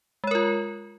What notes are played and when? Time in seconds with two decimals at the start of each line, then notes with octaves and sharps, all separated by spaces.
0.24 G#3
0.27 C#5
0.31 A#4
0.35 F4